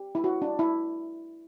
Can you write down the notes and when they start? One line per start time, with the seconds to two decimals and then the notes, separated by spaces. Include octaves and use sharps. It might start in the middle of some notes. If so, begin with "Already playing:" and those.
Already playing: G4
0.15 E4
0.24 F#4
0.42 D4
0.59 E4